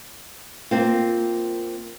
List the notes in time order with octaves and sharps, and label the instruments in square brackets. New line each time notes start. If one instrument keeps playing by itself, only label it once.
[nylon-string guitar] A#3 C4 F4